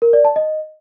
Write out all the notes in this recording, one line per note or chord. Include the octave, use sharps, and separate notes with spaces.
A#4
D5
A5
D#5